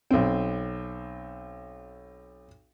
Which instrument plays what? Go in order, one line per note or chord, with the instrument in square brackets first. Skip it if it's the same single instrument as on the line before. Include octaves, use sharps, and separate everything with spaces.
[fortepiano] B1 C4